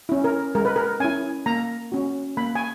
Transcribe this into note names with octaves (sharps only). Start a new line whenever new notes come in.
C#4 E4
A#4
G#3 A#4
B4
A#4
C#4 E4 G#5
A#3 A#5
C#4 F#4
A#3 B5
G#5